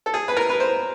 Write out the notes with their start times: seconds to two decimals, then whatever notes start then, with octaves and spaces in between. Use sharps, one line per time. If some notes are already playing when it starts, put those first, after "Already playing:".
0.06 A4
0.14 G#4
0.28 B4
0.37 A#4
0.49 B4
0.60 C5